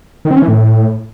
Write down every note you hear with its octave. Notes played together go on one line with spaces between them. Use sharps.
D#3
C4
C#4
E3
A2